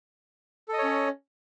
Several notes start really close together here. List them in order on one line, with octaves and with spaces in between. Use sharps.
A4 D#5 C#5 C#4